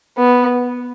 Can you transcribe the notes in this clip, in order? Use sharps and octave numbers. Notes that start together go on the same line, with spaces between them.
B3